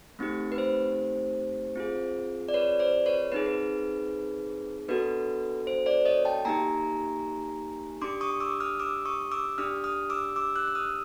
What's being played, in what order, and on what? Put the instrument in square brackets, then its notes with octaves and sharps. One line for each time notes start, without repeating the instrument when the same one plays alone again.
[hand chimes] A3 C4 D#4 G4
B4
C5
C4 F4 G#4
D5
B4 C#5
C5 D5
B4 C#5
C4 D#4 G#4 B4
B4
B3 D4 F#4 A4 B4
C5
C5 D5
C#5 D#5
G5 A5
A#3 D#4 G4 G#5 A#5
D4 G4 C6 D6
C#6 D#6
D6 E6
D#6 F6
D6 E6
C#6 D#6
D6 E6
D4 G4 D#6 F6
D#6 F6
D6 E6
D6 E6
E6 F#6
E6
D#6 F6